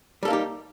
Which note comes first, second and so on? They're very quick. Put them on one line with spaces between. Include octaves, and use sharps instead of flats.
G3 A4 A#3 D#4 G4